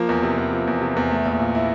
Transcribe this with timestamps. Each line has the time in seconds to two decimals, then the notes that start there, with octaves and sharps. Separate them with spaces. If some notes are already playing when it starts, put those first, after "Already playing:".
Already playing: F3 A#3
0.09 E2
0.23 C3
0.38 E2
0.52 F3
0.67 E2
0.82 C3
0.96 E2
1.11 A3
1.26 A#1
1.40 A#2
1.55 E4